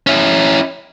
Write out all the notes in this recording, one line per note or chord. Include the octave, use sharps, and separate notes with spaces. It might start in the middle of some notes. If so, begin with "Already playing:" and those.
C#4 E4